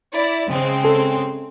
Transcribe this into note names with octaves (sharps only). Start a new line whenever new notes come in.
E4 D5
C#3 G#3 C4
A4